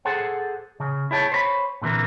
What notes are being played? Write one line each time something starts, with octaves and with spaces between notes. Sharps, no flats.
G#4 A4 C5 F#5
C#3
E4 G#4 C#5 G5 A5
C5 C#5 A#5 B5
A#2 D3 E3 C4 A#4